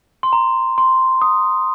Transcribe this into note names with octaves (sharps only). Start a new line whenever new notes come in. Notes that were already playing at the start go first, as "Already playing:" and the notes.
C6
A#5
C6
D#6